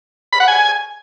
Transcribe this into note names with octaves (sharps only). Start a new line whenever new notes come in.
B5
F#5
G#5